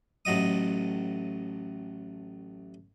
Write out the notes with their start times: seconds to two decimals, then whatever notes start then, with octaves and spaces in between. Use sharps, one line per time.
0.25 A1 A2 F#3 D#5 D#6